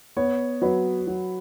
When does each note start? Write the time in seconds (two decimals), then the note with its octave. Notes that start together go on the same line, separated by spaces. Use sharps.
0.17 B3 C#5
0.62 F#3 B4
1.07 F#3